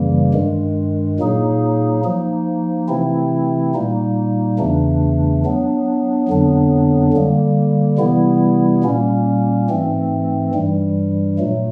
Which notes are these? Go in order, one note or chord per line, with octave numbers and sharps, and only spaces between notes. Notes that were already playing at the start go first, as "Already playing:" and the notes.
Already playing: F#2 C#3 E3 G3 A#3
G2 D#3 G#3
A#2 F#3 A#3 D#4 G#4
F3 A#3 D#4
C3 E3 A3 C4 E4
A#2 G3 A#3 D#4
E2 C#3 E3 A3 D4
F#3 B3 D4
F2 D3 F#3 B3 D4
D3 G3 A#3
C3 E3 G3 B3 E4
A#2 G3 A#3 C#4
G#2 E3 A3 C4
G2 E3 G3
A#2 F#3 A3